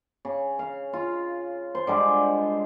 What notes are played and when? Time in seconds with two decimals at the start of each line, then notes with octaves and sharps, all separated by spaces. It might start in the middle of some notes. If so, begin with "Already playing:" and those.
0.25 C#3
0.59 F5
0.93 F4
1.75 C5
1.87 D3 G3 G#3